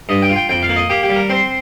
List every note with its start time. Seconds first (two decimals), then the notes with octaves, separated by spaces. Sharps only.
0.09 G2 D#5
0.22 G5
0.30 F4
0.36 G5
0.49 F2 G5
0.63 F5
0.69 A#3
0.76 D#5
0.90 A#3 G4
1.03 G4
1.09 G3
1.16 A#4
1.29 C4 C5